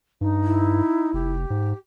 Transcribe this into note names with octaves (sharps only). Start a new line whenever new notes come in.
G2 D#4
E4
F1 G4
G#2